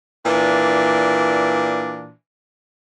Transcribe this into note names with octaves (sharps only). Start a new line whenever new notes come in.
A#2 E3 D4